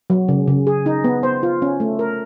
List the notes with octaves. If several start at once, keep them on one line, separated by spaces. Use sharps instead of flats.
F#3
C#3
C#3
G#4
D#4
B3
C5
F4
C#4
A3
A#4